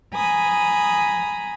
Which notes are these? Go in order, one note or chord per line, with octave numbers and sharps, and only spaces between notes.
G#5 A#5 B5 D#6